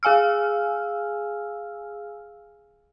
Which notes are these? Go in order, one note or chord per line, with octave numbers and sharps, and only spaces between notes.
G#4 F5 G#5 E6 F6